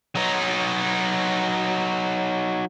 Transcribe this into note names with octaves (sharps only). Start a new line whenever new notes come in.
F#3 D#4